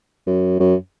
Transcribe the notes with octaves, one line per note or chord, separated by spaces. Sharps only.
F#2
F#2